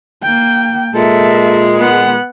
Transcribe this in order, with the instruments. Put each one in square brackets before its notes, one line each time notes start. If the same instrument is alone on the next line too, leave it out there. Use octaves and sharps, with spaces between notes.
[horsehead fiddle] A#3 G5
[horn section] A#2 G#3 [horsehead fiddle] A4 E5
[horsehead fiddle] B3 F#5